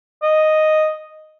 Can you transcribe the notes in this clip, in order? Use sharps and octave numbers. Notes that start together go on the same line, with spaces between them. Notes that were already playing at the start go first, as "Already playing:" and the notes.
D#5